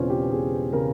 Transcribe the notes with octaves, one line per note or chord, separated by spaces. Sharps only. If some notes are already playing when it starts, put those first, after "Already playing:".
Already playing: E1 E2 C#3 C4 C#4 F4
G4
E1 G#4
C#3 A#4